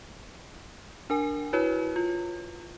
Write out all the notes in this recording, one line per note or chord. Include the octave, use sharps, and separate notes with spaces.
D4 A#4 G#5
E4 F#4 B4 C#5
F4